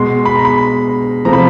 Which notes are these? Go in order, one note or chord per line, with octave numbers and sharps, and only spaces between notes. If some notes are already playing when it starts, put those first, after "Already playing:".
Already playing: B2 G#3 C6
B5
A#5
B5
C3 F3 A3 A#5
B5